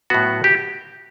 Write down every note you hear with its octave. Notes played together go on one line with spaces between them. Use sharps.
A2 F#3 B3 F#4
G4